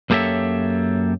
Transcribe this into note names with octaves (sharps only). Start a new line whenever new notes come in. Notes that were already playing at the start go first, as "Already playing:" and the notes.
F#2 A#3 G4 A4 C#5 E5